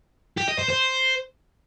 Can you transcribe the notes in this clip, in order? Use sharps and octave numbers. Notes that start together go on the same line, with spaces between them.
G4
D#5
C5
C5